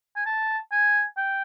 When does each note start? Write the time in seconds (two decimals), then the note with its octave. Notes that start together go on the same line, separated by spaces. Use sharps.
0.16 G#5
0.26 A5
0.72 G#5
1.17 G5